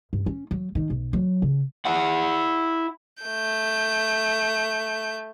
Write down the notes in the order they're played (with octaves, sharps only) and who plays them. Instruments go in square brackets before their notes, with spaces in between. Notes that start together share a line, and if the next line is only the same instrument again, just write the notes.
[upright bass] G2
C#4
F#3
D#3
B1
F#3
C#3
[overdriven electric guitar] E4 F#5
[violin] A3 G6